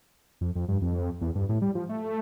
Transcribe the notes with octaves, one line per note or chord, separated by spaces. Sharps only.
F2
F2
G2
F2
E2
G2
A2
G3
F3
A3